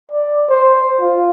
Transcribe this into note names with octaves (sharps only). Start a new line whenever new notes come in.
D5
C5
F4